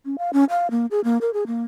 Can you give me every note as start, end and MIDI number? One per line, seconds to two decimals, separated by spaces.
0.05 0.16 61
0.18 0.31 77
0.33 0.44 61
0.50 0.70 77
0.71 0.86 58
0.91 1.00 68
1.04 1.18 58
1.21 1.30 70
1.34 1.44 68
1.47 1.63 58